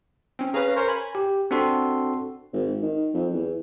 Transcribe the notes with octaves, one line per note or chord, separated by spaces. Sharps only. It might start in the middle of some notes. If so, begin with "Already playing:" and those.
C4 C#4
C#4 G#4 B4 F5 A#5
A#4 C5 C#5
G#5 B5
G4
C4 D4 F#4 A4 C6
G#1
D#3
F2
E2